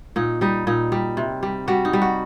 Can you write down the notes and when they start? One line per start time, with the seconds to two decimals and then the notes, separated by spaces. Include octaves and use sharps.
0.16 A#2 D#4
0.41 G3 D#4
0.67 A#2 D#4
0.92 G3
1.17 C3
1.43 G3
1.68 G3 F#4
1.85 D#4
1.93 G3
2.02 F#4